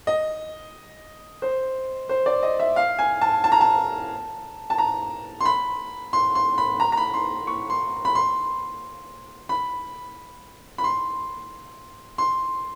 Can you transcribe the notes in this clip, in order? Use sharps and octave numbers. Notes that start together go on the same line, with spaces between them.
D#5
C5
C5
D5
D#5
E5
F5
G#5
A5
A5
A#5
A5
A5
A#5
C6
B5
C6
C6
B5
A#5
A#5
B5
C6
C#6
C6
B5
C6
B5
B5
C6
C6